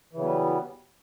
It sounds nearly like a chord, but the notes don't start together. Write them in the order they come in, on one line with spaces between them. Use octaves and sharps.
E3 C#3 F#3 B3 G3